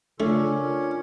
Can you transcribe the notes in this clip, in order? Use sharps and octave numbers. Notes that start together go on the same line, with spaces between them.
C#3 A3 C#4 D4 F4 A4
F4 A#4